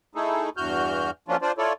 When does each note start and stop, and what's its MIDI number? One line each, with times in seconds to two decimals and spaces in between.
0.15 0.50 57
0.15 0.50 63
0.15 0.50 64
0.15 0.50 68
0.15 0.50 69
0.57 1.11 40
0.57 1.11 43
0.57 1.11 52
0.57 1.11 66
0.57 1.11 89
0.57 1.11 91
1.28 1.37 53
1.28 1.37 54
1.28 1.37 58
1.28 1.37 61
1.28 1.37 62
1.28 1.37 65
1.42 1.52 62
1.42 1.52 65
1.42 1.52 72
1.42 1.52 74
1.58 1.73 64
1.58 1.73 65
1.58 1.73 69
1.58 1.73 73
1.58 1.73 74